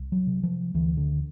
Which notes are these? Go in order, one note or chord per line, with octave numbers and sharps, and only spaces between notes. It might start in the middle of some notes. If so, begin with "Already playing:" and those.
Already playing: C2
F#3
C3
F3
D2 E3
D3